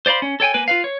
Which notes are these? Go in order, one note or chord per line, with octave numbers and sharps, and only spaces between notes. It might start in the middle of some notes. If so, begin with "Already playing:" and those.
C5 D5 F5 B5 C6
C#4
A4 C#5 G5 G#5
A#3 B4 G#5
F4 B4 F5
C#5